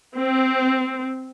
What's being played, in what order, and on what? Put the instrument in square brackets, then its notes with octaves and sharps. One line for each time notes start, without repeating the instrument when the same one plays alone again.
[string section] C4